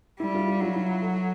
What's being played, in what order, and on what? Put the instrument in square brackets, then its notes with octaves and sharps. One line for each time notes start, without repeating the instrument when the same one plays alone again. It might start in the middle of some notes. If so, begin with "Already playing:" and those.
[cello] G3 [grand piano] E4
[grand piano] F4
E4
[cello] F#3 [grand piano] F4
[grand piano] E4
A4